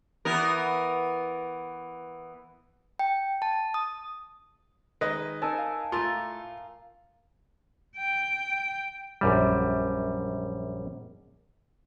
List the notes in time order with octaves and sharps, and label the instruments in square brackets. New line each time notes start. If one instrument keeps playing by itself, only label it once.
[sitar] E3 B3 A#4
[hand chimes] G5
A5
D#6
[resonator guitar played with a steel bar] D#3 G#3 [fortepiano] B4 D#5
[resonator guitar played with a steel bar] D#4 A#4 [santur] G#5 A5 E6
[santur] F5
[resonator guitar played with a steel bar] A2 A3 [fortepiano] F4 [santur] A#4
[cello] G5
[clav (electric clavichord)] A#1 F#2 G3